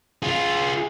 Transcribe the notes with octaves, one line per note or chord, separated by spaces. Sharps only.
F4 G#4